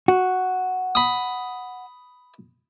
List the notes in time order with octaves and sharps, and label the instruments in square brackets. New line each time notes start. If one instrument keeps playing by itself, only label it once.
[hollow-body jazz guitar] F#4
[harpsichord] B5 D#6